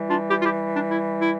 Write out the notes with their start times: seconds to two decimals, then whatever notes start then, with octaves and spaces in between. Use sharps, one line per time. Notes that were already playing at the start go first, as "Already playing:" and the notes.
Already playing: E3 G3
0.10 D4 F4
0.29 E4 G4
0.40 F4
0.45 E4 G4
0.75 D4
0.90 E4
1.21 E4